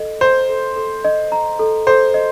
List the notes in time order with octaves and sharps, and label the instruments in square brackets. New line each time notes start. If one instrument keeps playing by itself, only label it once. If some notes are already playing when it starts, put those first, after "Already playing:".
Already playing: [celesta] A4 D#5
[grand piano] C5 [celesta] A#5
[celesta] A4
A4
D#5
A#5
A4
[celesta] A4 [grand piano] C5
[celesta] D#5